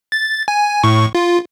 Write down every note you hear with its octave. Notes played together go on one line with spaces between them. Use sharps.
A6
G#5
A2 C#6
F4